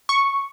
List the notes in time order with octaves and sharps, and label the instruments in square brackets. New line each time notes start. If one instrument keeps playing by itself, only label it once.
[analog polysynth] C#6